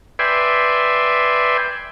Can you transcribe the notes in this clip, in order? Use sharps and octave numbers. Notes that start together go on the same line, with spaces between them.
B4 D5 E5 G5 G#5 C6